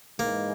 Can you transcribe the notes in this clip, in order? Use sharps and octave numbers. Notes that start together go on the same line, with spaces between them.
G#2 E3 G#3 A#3